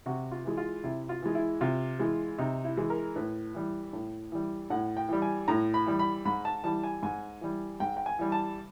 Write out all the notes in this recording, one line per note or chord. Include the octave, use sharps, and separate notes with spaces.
C3 F#4
F4
E3 G#3
F4
C3 E4
F4
E3 G#3
E4
C3 F4
E3 G#3
C3 D#4
E4
E3 G#3
A#4
A2 B4
E3 G3
A2
E3 G3
A2 F#5
G5
E3 G3
G#5
A2 A#5
B5
E3 G3
B5
G#2 B5
A5
E3 G3 A5
G#5
G#2 G#5
E3 G3
G#2 G5
G5
G#5
E3 G3
A5